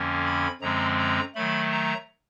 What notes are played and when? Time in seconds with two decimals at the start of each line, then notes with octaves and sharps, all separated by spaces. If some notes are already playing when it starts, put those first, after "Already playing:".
Already playing: F2 D3 F3 A#3 C#4
0.26 B5
0.61 F#2 D3 F3 G#3 C4 A#5
0.99 A#5
1.35 D#3 F#3 A3 B5
1.72 A#5